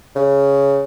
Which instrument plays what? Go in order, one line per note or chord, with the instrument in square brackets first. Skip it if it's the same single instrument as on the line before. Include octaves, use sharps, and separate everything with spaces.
[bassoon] C#3